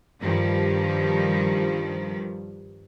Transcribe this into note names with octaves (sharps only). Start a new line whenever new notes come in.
G2 D#3 F3 G3